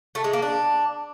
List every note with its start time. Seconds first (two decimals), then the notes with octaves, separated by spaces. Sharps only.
0.15 A3
0.24 G#3
0.33 A#3
0.42 D4